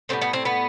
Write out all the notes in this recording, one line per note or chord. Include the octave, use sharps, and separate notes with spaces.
A2 G3 B3 C4
B3
C4
B3